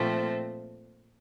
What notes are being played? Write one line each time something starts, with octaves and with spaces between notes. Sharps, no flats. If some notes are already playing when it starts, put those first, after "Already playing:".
Already playing: A#2 F3 A3 C4